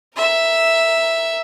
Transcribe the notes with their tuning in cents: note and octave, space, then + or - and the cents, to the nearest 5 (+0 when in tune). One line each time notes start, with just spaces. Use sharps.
A#4 +0 E5 +0